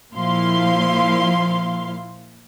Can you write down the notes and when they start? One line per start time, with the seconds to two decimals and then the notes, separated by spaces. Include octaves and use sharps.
0.14 A#2 F3 E4 F5 C6